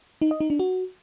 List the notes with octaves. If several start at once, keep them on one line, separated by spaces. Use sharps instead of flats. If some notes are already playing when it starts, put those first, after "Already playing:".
D#4
D#5
D#4
D4
F#4